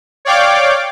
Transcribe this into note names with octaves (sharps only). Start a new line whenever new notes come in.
C#5 D5 F5 G5 D6